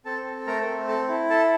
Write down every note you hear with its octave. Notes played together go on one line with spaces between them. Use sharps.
C4 A4 A5
A4
A3 A#4 A#5
C4
A4 A5
E4
A4 A5